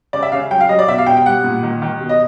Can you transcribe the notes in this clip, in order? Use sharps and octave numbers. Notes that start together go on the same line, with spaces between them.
C#3 D5
E5
C#3 F5
F#3 G5
F5
F#3 D#5
D5
B2 E5
F5
B2 G5
G5
G3 F#5
A#2
D#3
D#3
B2
D#5